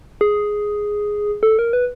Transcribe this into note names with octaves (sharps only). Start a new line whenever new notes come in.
G#4
A4
A#4
B4